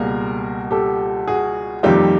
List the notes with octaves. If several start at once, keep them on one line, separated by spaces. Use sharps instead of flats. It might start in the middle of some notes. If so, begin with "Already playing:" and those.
Already playing: C#2 B2 G3 A#3 G#4 A#4
G4 A4
F#4 G#4
F2 C3 D#3 G3 A#3 F4 G4